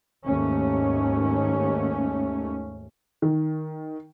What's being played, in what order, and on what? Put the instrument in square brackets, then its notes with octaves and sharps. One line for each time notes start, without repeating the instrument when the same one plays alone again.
[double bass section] D#2 G#2 A3 C#4
[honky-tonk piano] D#3